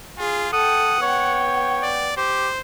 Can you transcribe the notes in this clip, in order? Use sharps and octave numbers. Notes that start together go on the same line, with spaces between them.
F4 G#4
A4 F#5 G5 D#6
B3 C#5 G5
D5
G4 C5